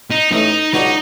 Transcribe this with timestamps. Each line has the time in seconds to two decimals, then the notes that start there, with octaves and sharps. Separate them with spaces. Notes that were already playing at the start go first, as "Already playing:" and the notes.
0.11 D#4
0.32 A1 A2 E3 D#4
0.73 C#2 B2 F#3 B3 D4 D#4